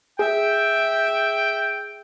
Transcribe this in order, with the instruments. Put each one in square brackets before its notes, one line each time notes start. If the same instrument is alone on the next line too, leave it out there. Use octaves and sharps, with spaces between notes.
[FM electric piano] G#4 [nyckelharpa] E5 [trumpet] G5